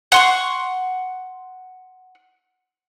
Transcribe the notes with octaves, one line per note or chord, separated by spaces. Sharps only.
F#5 C6 C#6